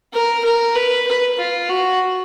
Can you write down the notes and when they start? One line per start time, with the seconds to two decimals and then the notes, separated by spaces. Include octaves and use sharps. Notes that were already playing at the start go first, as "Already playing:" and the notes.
0.13 A#4
0.44 A#4
0.75 B4
1.07 B4
1.39 F4
1.69 F#4